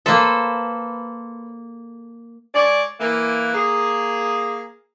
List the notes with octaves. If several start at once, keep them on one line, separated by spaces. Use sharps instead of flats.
A#3 A4 B4 C5
G#3 C#5 D5
E3 A#3
A#3 G#4